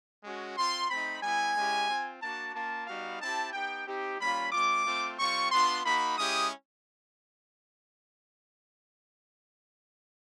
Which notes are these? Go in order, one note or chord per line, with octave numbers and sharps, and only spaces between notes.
G#3 C#4 F#4
C4 F4 C6
A3 C4 D#4 B5
G3 B3 E4 G#5
G#3 C#4 E4 G4
C4 F4
A#3 D4 F#4 A5
A#3 C#4 F4 A5
G3 B3 D#4 F#4 F5
C4 E4 G4 A5
B3 D#4 G4 G5
C4 D#4 G4
G3 A#3 C#4 F4 B5
G#3 C4 F4 D6
A3 C4 F4
G3 C4 F4 C#6
B3 D4 F4 C6
A#3 D#4 F#4 B5
G#3 C#4 E4 G4 D#6